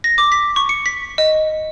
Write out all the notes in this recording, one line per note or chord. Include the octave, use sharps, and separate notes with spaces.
A#6
D6
B6
C#6
C#7
B6
D#5